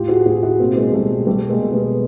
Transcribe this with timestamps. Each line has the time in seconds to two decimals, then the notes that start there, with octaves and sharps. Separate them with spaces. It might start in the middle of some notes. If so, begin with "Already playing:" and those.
Already playing: A2 F4 G4
0.08 F#4 G#4
0.26 A2 F#4 G#4
0.43 E4 F#4
0.59 B2 A#3 C4
0.76 G#3 A#3
0.93 B2 G3 A3
1.26 B2 G3 A3
1.49 G#3 A#3
1.61 B2
1.71 A3 B3